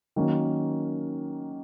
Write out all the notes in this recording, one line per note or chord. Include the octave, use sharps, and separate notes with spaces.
D#3 F#3 A#3 C#4